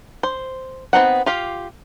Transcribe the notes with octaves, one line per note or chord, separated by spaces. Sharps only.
C5
B3 C4 D#4 F#5
F4 G4 F5